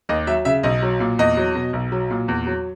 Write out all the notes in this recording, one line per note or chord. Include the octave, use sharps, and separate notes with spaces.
D#2 D#5
F#3 E5
C#3 E5
B1 D#5
F#3
A#2
E2 D#5
F#3
B2
B1
F#3
A#2
E2
F#3